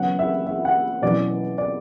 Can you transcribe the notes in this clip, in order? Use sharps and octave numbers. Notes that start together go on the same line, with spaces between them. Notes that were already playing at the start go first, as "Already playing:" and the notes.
Already playing: C#3 F#3 B3 F#5
E5
E5
F#5
B2 F#3 C#4 E4 D5
D5